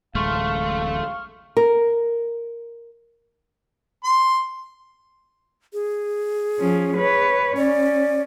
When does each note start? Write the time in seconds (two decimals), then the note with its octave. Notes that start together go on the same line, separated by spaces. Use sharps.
0.15 D1 A1 G#3 A3 F5 C6 C#6 F6
1.57 A#4
4.04 C6
5.73 G#4
6.59 F3 C#4
6.97 B4 C#5
7.57 C#4 D5